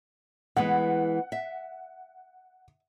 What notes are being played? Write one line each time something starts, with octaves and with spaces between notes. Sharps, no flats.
E3 G#3 B3 F#5
E5